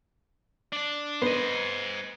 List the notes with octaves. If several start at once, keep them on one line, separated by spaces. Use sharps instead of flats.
D4 D5
B3 C5 D#5